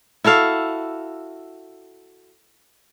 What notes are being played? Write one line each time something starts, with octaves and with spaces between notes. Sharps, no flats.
E4 F#4 A4 F5